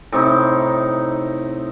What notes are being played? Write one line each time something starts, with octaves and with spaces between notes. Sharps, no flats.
A2 C3 D#4